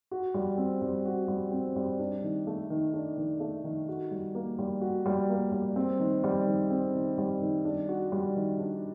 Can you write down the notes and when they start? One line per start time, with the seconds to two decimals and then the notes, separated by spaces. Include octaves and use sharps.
0.11 F#4
0.34 G3
0.58 C4
0.82 G3
1.05 F#4
1.28 G3
1.52 C4
1.76 G3
1.99 D4
2.23 D#3
2.47 A3
2.70 D#3
2.94 D4
3.17 D#3
3.40 A3
3.64 D#3
3.88 F#4
4.11 G3
4.35 A#3
4.59 G3
4.81 F#4
5.06 G3
5.29 A#3
5.52 G3
5.76 C4
5.99 D#3
6.24 G3
6.47 D#3
6.70 C4
6.95 D#3
7.18 G3
7.42 D#3
7.65 D4
7.89 F#4
8.12 G3
8.36 D#3
8.59 D4